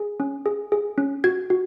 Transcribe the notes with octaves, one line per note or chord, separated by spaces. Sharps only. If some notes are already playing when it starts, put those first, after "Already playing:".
Already playing: G#4
C#4
G#4
G#4
C#4
F#4 G#6
F#4